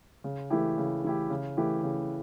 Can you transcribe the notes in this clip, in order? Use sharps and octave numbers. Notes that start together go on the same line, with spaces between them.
C#3
E3 A3 E4 G4
C#3
E3 A3 E4 G4
C#3
E3 A3 E4 G4
C#3